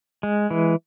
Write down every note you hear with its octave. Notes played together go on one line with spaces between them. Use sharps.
G#3
E3